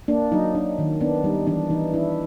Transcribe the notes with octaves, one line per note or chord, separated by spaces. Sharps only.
A#3 D4
F#3 D#4
D4
D#3
B3 D4
G3 D#4
E3 D4
E3 D#4
D4 E4